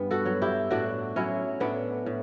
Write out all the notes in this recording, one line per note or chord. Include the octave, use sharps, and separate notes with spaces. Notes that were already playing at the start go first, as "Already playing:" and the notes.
Already playing: G2 B3
F#4 A4
F#3
E4 G4
A2 D4 F#4
F#3 C#4 E4
A2 B3 D4
A2